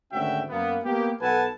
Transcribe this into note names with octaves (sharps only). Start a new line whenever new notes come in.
G#1 D2 C#4 F#4 E5 G5
F#2 A#3 B3
A#3 B3 G4
B1 A4 B4 F#5 G#5 A5